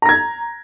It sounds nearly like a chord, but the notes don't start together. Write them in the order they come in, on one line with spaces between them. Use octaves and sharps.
A#5 A#6 G#6